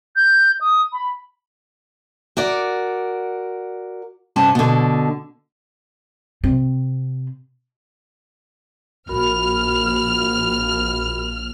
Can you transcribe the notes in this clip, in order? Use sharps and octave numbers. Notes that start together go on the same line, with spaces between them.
G6
D#6
B5
F#4 A#4 D5
G2 C3 C#4 A5
B2 D3
C3 C4
A#1 F#4 A#4 B5 F6